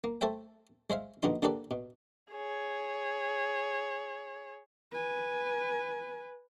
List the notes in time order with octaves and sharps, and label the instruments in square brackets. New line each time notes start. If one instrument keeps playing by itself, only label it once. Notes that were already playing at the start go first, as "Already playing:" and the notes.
[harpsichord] A#3
A3 A4 C5 E5 G5
G#3 C5 E5 F5
A#1 B2 D3 B3 D#4 C6
D3 A#3 G4 A4 B4 D5
B2
[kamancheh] G#4 C#5
[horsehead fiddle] B4 G#5